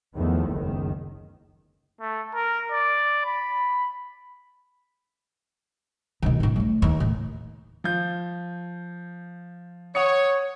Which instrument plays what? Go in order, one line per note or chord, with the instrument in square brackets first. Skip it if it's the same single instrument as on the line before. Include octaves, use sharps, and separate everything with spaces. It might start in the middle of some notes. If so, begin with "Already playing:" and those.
[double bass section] E2 D#3 F3 A3 B3
F#1 C#2 D#3
[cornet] A3
A#4
D5
B5
[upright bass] B2 D#3
A2 E4
F#3 A3
D#2
A2
[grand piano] F3 G6
[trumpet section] C#5 [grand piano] F#5 D#6 C#7